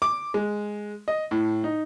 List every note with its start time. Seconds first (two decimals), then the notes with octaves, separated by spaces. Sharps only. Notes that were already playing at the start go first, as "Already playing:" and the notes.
0.02 D6
0.34 G#3
1.08 D#5
1.31 A2
1.64 D#4